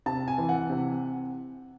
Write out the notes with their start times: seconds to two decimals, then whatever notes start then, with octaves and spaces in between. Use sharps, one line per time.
0.06 C3 A5
0.28 G#5
0.38 E3
0.49 F#5
0.70 C3